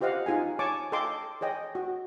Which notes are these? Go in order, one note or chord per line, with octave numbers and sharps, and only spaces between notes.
F4 G4 C5 D#5 F5 F#5
D#4 F4 G#4 G#5
C#5 G#5 A5 C#6 D6
A4 D#5 F5 G5 C6 D6
G#4 C#5 D#5 G5
F#4